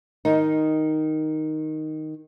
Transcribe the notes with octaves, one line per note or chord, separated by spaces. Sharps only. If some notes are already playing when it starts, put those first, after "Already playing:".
D#3 D#4